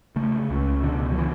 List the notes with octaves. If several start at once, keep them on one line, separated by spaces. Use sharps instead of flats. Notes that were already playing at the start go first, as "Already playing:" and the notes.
C#3 A3
C#2
B2 D3
F#3
B2 E3